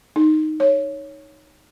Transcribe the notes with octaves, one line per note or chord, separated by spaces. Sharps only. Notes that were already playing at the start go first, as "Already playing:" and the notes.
D#4
C#5